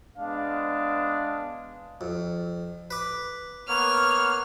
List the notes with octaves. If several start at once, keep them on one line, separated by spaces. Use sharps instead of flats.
G#3 B3 D4 F5
F2
B4 D6
A#3 B3 C#5 F6